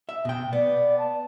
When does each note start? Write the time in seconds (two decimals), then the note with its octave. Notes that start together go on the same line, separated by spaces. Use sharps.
0.09 E5
0.25 B2 G5
0.53 B3 D5
0.98 A5